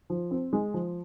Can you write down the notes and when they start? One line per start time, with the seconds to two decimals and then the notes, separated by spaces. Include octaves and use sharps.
0.10 F3
0.31 C4
0.53 G#3
0.74 F3